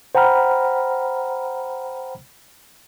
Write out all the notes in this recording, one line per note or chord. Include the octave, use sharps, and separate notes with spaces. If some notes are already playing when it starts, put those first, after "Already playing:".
C5 F#5 G5 A#5 B5 F6